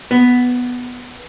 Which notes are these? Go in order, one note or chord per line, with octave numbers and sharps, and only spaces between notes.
B3